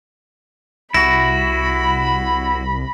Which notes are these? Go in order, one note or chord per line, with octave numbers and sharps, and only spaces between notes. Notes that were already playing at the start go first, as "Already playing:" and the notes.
C2 E4 F#4 B5 A#6